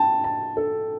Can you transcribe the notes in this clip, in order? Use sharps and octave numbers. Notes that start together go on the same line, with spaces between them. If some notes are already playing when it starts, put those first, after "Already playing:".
Already playing: G5 A5
A5
A4